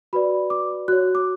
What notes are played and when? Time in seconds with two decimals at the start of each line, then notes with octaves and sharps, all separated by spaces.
0.13 F#4 B4 D5 B5
0.50 D6
0.88 F#4 C#5 F#6
1.15 D6